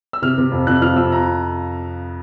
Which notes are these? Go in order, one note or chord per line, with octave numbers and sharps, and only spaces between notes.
E6
C3 F6
C3
F2
F2 F#6
F3 F6
F2 E6
A#5